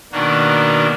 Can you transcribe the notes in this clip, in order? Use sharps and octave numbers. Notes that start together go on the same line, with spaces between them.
B2 D#3 A#3 D4 F#4